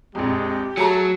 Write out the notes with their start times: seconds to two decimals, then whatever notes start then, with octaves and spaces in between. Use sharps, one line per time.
0.15 A#1 F2 G#3 G4
0.77 F#3 A3 G#4 A5 A#5